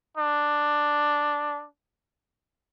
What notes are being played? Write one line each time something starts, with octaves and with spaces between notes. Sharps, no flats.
D4